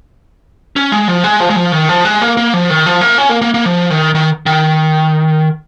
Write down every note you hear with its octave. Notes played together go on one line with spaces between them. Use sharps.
C#4
G#3
F3
G#3
F3
G#3
F3
D#3
F3
G#3
A#3
A#3
F3
D#3
F3
A#3
C#4
A#3
A#3
A#3
F3
D#3
D#3
D#3